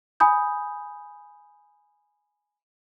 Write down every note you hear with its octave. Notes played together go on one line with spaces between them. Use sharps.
G#5 B5 D#6 G6